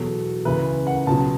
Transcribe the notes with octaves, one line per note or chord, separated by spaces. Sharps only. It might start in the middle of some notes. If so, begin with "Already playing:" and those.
Already playing: E2 B2 F#3 A4
C#2 C#3 E3 B4
F#5
C#2 B2 F#3 A5